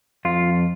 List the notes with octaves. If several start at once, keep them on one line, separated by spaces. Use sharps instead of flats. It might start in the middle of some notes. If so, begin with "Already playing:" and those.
F2 F4